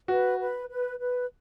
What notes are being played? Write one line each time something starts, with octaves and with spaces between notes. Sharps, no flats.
F#4 B4
B4
B4
B4